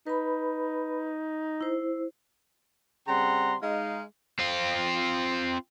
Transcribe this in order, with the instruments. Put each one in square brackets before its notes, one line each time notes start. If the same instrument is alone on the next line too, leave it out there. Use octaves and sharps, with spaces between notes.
[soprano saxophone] D#4 [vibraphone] B4 B5
[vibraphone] E4 C5
[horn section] C#3 G3 C4 F#5 A#5 C6
G#3 D#4 F5
[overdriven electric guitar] C4 F4